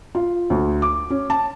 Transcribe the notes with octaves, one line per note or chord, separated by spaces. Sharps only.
F4
D2
D6
C#4
A5